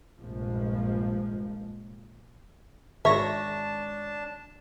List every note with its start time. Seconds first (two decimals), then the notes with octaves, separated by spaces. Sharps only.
0.19 F1 A#1 G2 F3 G#3 A#3
3.05 G#1 D4 C#5 E5 A5 A#6